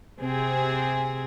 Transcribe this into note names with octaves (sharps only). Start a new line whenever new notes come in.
C3 C4 G#4